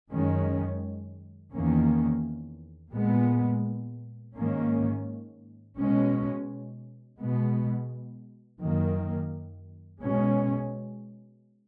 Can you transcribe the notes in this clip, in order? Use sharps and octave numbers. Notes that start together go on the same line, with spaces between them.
F#2 D#3 G#3 C#4
E2 D#3 A#3 C#4
A#2 G#3 B3
G#2 D#3 A#3 C#4
B2 G#3 C#4
B2 G#3 B3
F#2 D#3 A#3
B2 G#3 C#4